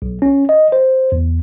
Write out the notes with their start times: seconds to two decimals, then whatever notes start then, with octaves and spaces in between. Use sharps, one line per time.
0.02 B1
0.22 C#4
0.49 D#5
0.72 C5
1.12 E2